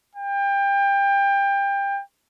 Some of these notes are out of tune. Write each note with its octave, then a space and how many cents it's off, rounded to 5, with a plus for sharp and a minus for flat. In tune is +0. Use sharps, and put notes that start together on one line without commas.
G5 +25